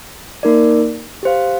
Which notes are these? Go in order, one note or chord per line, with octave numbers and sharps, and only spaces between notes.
A#3 D#4 A#4 D5
G4 C5 F5